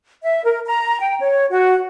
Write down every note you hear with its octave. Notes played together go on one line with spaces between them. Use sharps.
E5
A#4
A#5
G5
C#5
F#4